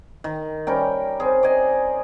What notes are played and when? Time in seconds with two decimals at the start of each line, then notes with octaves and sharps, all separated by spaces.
0.24 D#3
0.67 G3 C#4 A#4 G5
1.20 C4 G#4
1.43 D5 D#5 G#5